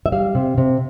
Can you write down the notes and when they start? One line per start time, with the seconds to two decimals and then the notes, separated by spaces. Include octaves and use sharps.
0.06 E5
0.12 G3 F5
0.35 C3
0.58 C3